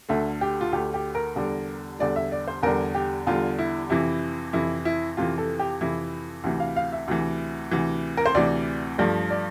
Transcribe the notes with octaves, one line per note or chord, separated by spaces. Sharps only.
D2 D3 A3 E5
G4
F4
D2 D3 A3 G4
G4
A#4
E2 D3 G3
E2 D3 G3 D5
E5
D5
C5
E2 D3 G3 A#4
G4
E2 D3 G3 F4
E4
F2 C3 E3 E4
F2 C3 E3 E4
E4
F2 C3 E3 F4
A4
G4
F2 C3 E3 E4
D2 C3 E3
F5
F5
E5
D2 C3 E3
D2 C3 E3
A#4
C5
D2 C3 E3 D5
G2 F3 A3 D5
D5